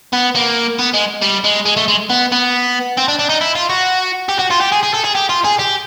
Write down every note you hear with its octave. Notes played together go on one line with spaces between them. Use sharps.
B3
A#3
B3
G#3
G3
G#3
G#3
A3
G#3
B3
B3
C4
D4
D4
D#4
E4
F4
F#4
G4
F#4
F4
G4
G#4
G#4
A4
G#4
G4
F4
G#4
G4